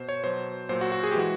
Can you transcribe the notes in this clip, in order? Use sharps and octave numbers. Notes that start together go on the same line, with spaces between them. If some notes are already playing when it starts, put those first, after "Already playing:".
Already playing: B2 C5
C#5
B2 F#3 C5
A#2 F#3 C5
F#4
F#4
G#4
G4
E3 G#3 F#4